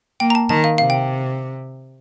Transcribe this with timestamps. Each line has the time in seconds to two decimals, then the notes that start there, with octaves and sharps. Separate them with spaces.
0.20 A#3 G5
0.30 A#5
0.35 A5
0.49 D#3 A5
0.64 F5
0.78 C3 F5
0.90 G5